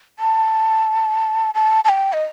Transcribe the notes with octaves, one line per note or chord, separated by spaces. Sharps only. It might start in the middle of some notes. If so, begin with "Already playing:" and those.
A5
A5
A5
G5
D#5